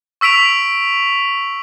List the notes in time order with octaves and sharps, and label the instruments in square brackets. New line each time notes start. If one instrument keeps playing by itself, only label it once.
[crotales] C#6 E6 B6 D7 F7